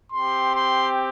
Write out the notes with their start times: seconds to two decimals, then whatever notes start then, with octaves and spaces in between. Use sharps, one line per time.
0.12 C4 G4 C6
0.56 C6